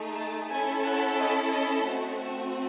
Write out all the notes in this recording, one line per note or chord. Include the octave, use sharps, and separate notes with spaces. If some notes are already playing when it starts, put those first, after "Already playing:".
Already playing: A3 D#4 G#4
A5
C#4 E4 A4 G#5
F#5
D#5
D#5
A3 C4 F#4
E5